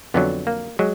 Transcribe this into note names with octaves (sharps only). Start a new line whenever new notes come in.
F2 D3 F#3 B3
A#3
F#3 G#3